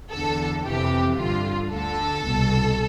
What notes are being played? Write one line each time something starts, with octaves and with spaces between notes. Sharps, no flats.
E2 D3 A4
F2 C3 E3 G4
G2 D3 F4
D2 D3 A4
C2 B2